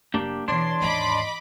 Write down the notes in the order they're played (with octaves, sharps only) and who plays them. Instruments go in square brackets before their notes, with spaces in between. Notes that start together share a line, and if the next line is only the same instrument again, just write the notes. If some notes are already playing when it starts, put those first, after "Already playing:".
[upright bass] F1 F#3 [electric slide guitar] A#3 D4 G4
[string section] E2 [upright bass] B2 [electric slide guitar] D4 C#5 D5 [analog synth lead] C6
[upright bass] D#2 G#2 [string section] D#5 B5 D6